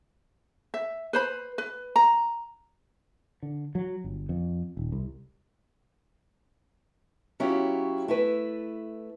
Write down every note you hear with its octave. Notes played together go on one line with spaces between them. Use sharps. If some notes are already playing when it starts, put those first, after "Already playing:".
E5
B4 C5 B5
B4
A#5
D3
F#3
G1
F2
D#1
C2
F#3 C#4 E4 F4 G4
A3 E4 B4